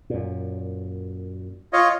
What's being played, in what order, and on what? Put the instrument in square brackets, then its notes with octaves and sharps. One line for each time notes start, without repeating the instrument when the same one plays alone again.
[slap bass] F#2 A#2
[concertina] F4 C#5 D#5